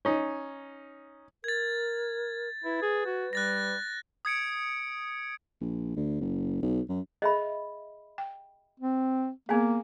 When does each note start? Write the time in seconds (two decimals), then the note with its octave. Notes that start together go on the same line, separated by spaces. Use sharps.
0.05 C#4 D#4
1.44 A#4 G#6 A6
2.64 E4 B4
2.82 G#4
3.06 F#4
3.33 G3 F#6 A6 A#6
4.25 D#6 G#6 C#7 D7
5.61 A#1
5.96 D2
6.21 F#1
6.62 B1
6.89 F#2
7.22 G#4 D#5 E5 B5
8.18 G5
8.80 C4
9.49 A#3 B3 G#4 F5 G#5